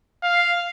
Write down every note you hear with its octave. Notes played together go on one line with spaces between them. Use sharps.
F5